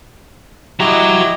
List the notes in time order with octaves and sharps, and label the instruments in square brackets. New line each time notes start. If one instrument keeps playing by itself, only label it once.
[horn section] E4 G4 D#5 [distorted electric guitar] F#4 A#5